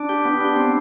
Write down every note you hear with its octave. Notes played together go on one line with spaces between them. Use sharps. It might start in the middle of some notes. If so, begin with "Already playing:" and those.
Already playing: D4
G4
B3
D4
C4